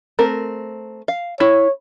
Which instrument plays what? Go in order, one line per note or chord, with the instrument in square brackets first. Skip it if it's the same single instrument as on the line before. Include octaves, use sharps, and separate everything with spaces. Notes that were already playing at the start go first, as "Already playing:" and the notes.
[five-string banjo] A3 C4 A#4
F5
[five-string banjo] E4 [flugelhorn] C#5